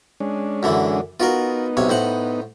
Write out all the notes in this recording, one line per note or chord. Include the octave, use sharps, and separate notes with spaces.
G#3 C#4 D4
F#2 D3 E3
B3 D#4 F4 F#4 A#4
B1 C3 C#5
A2 C5 F#5